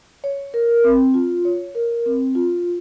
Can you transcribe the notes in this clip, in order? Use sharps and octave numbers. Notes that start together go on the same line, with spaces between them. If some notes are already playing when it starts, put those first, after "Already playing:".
C#5
A#4
C4
F4
C#5
A#4
C4
F4